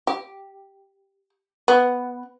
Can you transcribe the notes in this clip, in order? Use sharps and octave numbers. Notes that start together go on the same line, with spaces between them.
G4
B3